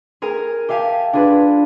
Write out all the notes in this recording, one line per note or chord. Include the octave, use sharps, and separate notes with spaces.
G#4 A#4 G#5
G4 E5 F5 G#5 A5
D4 F4 G#4 B4